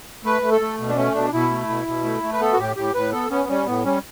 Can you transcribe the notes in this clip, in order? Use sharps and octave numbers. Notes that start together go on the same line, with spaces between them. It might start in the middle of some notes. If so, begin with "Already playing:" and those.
A3 B4
A3
A4
A3
B2
D4
A3 C#4
B2 D4
B2 E4
A3
B2
B2
A3
A3
B4
B3 A4
F#4
A2 G4
A2 G4
A2 B4
B3 A4
B3 C#4
G3 C#4
A2 B3
G3 C#4